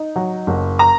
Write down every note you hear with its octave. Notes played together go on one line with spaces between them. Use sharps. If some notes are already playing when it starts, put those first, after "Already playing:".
Already playing: D#4
F#3
F#1
A#5